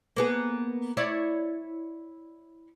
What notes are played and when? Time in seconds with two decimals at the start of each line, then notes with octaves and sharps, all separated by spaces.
0.16 A#3 B3 G#4
0.97 E4 C#5 D5